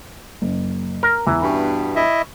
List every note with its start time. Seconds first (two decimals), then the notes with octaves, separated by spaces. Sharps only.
0.42 F#1
1.03 A#4 A#6
1.27 E2 E3 A#5
1.42 G2 B2 B3 B5 C#6
1.96 E4 D#5 E5